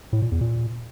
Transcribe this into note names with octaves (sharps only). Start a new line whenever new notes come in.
A2
A#2
E2
A#2